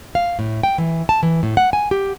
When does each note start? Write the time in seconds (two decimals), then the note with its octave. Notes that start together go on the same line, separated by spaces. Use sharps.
0.15 F5
0.39 A2
0.63 G5
0.78 E3
1.09 A5
1.23 E3
1.43 A2
1.57 F#5
1.73 G#5
1.91 G4